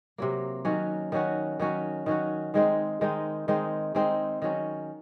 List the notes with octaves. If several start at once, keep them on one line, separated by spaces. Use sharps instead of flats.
C3 F#3 A#3
D#3 F#3 C#4 F#4
D#3 F#3 C#4 F#4
D#3 F#3 C#4 F#4
D#3 F#3 C#4 F#4
D#3 G#3 C4 D#4
D#3 G#3 C4 D#4
D#3 G#3 C4 D#4
D#3 G#3 C4 D#4
D#3 F#3 C#4